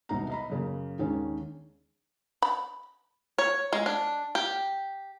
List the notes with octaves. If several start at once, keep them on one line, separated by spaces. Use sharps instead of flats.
E1 C2 C3 B3 D#4 A#5
D#5 A#5 B5
F#2 C#3 A#3
D#2 D#3 G#3 C#4 D4
B5
C#5
G#3
D4
G4